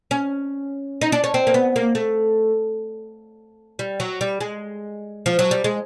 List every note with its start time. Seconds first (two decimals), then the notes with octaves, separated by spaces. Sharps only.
0.11 C#4
1.01 D#4
1.12 D4
1.24 C#4
1.34 C4
1.47 A#3
1.54 B3
1.76 A#3
1.95 A3
3.79 G3
4.00 F#3
4.21 G3
4.41 G#3
5.26 F3
5.39 F#3
5.51 G3
5.64 G#3